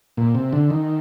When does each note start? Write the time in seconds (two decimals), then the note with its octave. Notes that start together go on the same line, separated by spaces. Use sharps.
0.17 A#2
0.35 C3
0.53 D3
0.70 D#3